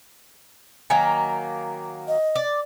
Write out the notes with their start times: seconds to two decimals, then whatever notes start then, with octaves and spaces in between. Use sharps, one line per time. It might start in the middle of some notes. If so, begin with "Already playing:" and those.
0.90 D#3 F#3 A#3 G#5
2.08 D#5
2.36 D5